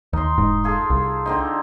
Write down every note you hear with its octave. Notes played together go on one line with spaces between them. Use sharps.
D#2 D#4 C6
E1 G#2
F4 G#4 A4
C2
D3 C4 D#4